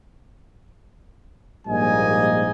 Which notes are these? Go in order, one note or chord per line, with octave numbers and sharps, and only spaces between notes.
A#1 G#2 G3 A#3 D#5 G#5